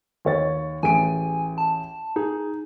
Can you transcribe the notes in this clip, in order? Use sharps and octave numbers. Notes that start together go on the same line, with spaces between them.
D#2 C#5 A6
A1 G#4 G#5 D7
A5
D#4 G#4